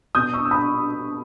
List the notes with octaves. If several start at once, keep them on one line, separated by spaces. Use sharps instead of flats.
B2 D#6 G6
C#6 E6
E6
B5 D#6